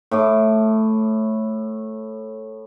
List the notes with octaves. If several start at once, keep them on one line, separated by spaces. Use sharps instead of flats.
A2 D6